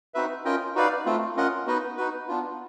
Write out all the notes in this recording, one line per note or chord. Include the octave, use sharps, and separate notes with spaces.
C4 D#4 F#4 B4 E5
C#4 F4 A#4 D#5 G5
D#4 F#4 B4 D5 F5
A3 C4 F4
C#4 F4 A#4 D#5 F#5
B3 D#4 F#4 B4 D#5
D#4 F#4 B4
B3 D4 F4